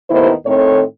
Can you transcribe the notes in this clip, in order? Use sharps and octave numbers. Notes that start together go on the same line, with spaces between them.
D#2 A2 D#3 B3 E4 C5
A2 D#3 C4 A4 C#5